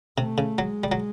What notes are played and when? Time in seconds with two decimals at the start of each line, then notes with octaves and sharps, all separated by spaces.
0.18 C3 A3
0.38 C#3
0.58 F#3 G#3
0.84 G3
0.92 F#3